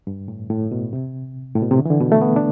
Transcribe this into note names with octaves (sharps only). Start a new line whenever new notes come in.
G2
A2
A2
B2
C3
A2
B2
C3
D3
E3
D3
B2
A3
B3
D4